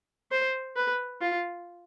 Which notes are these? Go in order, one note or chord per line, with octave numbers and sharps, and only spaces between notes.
C5
B4
F4